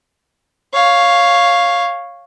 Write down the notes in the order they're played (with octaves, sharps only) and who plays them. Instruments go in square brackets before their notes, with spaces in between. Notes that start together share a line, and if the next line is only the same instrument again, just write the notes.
[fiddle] C#5 F5